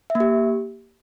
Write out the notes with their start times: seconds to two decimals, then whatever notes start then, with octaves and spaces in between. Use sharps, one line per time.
0.10 E5
0.15 A#3
0.20 G4